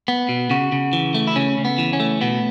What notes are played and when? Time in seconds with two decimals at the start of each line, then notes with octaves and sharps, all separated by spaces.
0.08 B3
0.29 B2
0.50 C#3 F#4
0.72 C#3
0.93 E3
1.14 A3
1.27 E4
1.36 C#3 C#4
1.58 C#3
1.65 B3
1.78 E3
1.93 C#4
2.00 A3
2.21 B2 B3